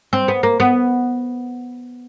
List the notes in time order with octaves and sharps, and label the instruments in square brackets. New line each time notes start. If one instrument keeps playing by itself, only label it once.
[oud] C4
B3
A#3
B3